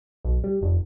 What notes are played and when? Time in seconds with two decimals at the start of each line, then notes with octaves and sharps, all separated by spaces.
0.25 B1
0.44 G3
0.61 F1